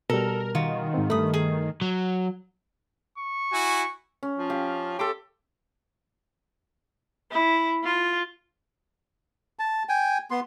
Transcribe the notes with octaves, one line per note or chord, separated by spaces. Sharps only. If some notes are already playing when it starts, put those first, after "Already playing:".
B2 G3 A4 A#4
D#3 F4 F#4
G#2 C4
G2 A3 B5 D#6
G#4
F#3
C#6
E4 F#4 G#5
C#4
F3
G4 F5
G4 A4 A5 C6
E4
F4
A5
G5 G#5
B3 C6